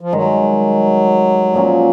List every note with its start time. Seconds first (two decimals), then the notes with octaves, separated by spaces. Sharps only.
0.01 F3
0.13 G2 D#3 F#3 G#3
1.54 A#2 F3 A#3 C#4